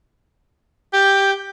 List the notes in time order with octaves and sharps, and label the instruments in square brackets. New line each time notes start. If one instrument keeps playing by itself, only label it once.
[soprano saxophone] G4 [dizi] G6